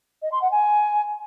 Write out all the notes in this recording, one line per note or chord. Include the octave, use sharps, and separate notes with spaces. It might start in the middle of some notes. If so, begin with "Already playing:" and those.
D#5
C6
F#5
G#5